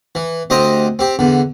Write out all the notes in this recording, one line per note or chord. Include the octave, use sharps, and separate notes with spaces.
E3
D2 C4 G4 D#5 C6
C4 G4
E2 D3